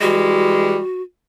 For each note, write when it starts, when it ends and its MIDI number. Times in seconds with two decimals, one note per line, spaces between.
0.01 0.76 52
0.01 0.76 55
0.01 0.76 56
0.01 1.02 66